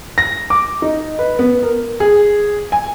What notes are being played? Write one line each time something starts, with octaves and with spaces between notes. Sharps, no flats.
A#6
D6
D#4
B4
B3
A#4
G#4
G#5